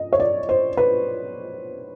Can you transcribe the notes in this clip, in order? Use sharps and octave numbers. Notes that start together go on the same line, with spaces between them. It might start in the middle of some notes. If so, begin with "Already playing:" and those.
Already playing: D#5
C#5
D5
C5
B4